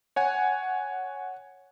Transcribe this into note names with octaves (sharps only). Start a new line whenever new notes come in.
C#5 F#5 G#5